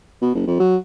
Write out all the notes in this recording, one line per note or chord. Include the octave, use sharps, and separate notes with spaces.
B2
F#1
F2
F#3